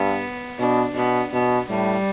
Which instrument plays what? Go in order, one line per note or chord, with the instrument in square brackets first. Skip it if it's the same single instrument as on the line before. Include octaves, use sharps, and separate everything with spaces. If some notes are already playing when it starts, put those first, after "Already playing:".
Already playing: [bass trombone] G2 [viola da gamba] B3
[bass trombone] B2 [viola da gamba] D4
[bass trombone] B2 [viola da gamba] B3
[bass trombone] B2 [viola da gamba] B3
[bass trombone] A2 [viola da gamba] G3